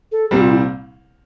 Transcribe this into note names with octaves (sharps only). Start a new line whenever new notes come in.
A4
C2 A#2 G3 C4 G4
F4
E4